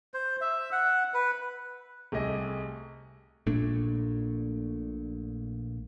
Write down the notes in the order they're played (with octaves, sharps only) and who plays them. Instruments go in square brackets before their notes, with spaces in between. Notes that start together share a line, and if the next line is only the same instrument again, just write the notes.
[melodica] C5
E5
F#5
B4
[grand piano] C2 A3 G4 G#4 D#5 G#5
[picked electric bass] A#1 A#2 A3 D4